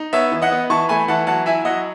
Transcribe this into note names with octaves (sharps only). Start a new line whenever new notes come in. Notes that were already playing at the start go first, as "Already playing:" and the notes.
Already playing: D#4
B3 C#5 E5
E3
D#5 F#5
B3
E3 A5 C#6
A3 G#5 B5
E3 F#5 A5
F#3 F#5 A5
E4 E5 G#5
F#3 D#5 F#5